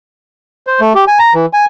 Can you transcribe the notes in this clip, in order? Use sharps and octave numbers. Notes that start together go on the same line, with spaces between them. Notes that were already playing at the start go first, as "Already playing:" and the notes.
C5
A3
G4
G#5
A#5
E3
G#5